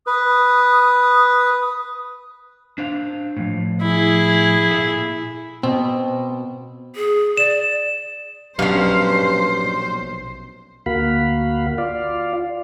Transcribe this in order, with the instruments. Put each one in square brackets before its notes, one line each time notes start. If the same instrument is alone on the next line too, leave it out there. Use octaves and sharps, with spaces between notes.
[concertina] B4 [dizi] D#6
[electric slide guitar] D4 C5 F5
A2 F3
[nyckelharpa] E4 G#4
[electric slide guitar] A#2 A4 E5
[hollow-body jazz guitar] B2 [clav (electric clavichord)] C4
[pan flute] G#4
[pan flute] D5 [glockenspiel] E7
[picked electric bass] A#1 B2 F#3 [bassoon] G2 [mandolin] C#4 F5 [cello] C5
[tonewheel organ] D2 A#3 F#4 F5 B5
F4 D5 F5